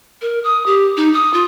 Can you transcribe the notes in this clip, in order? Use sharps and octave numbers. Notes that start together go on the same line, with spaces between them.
A#4
D#6
G4
D#4
D#6
F4